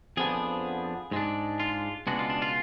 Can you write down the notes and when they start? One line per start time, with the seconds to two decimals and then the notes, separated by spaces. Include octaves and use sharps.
0.17 F2 F3 B3 D4 G#4
1.11 G#2 G#3 D4
1.60 F4
2.07 C#2 B2 G#3 D4 F#4
2.19 F4
2.30 D4
2.42 F4